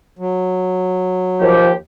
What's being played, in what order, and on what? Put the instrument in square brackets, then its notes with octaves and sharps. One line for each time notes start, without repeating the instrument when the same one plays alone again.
[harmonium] F#3
[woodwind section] D#2 G4 [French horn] F3